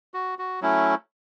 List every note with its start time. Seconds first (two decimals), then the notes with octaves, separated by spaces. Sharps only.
0.14 F#4
0.39 F#4
0.61 F#3 A3 C#4 E4